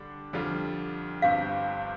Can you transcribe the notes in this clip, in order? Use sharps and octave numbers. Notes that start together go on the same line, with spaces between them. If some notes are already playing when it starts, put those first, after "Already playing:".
Already playing: D3 G3 D4
F2 D3 G3 F4
G1 G2 G3 C4 F5